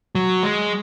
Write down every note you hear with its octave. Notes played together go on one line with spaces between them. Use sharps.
F#3
G#3